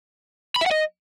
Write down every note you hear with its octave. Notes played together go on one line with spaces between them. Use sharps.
B5
E5
F#5
D#5